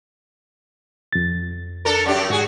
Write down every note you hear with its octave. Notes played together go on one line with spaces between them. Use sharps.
F2 A6
D4 A4 A#4
F#2 D4 G4
G#2 F#4 G#4